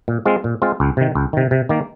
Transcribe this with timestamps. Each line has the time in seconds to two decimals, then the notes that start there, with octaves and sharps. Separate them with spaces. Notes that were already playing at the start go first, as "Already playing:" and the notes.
0.08 A#2
0.26 G#3 C4 F4
0.44 A#2
0.62 G#3 C4 F4
0.80 C#2
0.97 C3 D#3
1.15 C#2
1.33 C3 D#3
1.51 C3
1.69 D#3 A#3